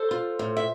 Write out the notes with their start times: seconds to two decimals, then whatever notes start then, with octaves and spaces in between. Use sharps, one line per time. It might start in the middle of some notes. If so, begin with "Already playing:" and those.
Already playing: A4 C5
0.11 F4
0.39 A2
0.57 E5